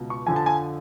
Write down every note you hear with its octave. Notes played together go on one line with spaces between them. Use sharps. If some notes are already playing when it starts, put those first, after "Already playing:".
Already playing: C#2 B2
C#6
F2 D3 F3 G#5
A5
G#5